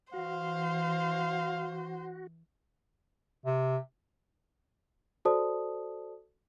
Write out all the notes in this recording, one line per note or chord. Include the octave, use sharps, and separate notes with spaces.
E3 F#4 C5 F5
C3
F#4 A4 C5 D5 A5 D#6